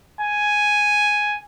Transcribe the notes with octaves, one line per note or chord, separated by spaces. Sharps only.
G#5